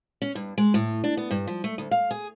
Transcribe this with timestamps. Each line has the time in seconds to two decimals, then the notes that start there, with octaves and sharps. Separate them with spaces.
0.22 C#4
0.35 G2
0.58 G#3
0.74 A2
1.04 D4
1.17 B3
1.31 G2
1.47 F3
1.64 A3
1.78 D2
1.91 F5
2.11 G#4